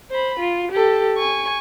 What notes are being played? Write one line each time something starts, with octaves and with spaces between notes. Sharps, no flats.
C5 B5
F4
G4 A4
G#5 C#6